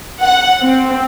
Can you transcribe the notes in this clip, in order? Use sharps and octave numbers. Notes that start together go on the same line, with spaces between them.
F#5
C4